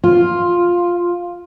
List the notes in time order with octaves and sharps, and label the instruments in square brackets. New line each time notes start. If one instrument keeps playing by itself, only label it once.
[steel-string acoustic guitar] F4